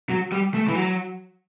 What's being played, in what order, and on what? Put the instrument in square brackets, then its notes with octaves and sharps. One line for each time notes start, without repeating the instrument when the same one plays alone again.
[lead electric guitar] F#3
G3
A3
E3
F#3